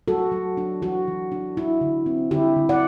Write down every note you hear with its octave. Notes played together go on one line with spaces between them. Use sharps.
F#3 F#4 A4
F#3
D4
E3 F#4
E3
D4
E4
D3
C4
D3 E4 G4
D3
D5 F#5